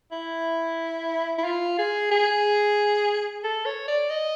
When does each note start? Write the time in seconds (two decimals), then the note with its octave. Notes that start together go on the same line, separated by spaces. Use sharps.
0.12 E4
1.38 E4
1.45 F4
1.79 G#4
2.11 G#4
3.44 A4
3.66 C#5
3.88 D5
4.10 D#5